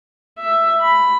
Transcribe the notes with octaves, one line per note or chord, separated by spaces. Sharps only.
E5
B5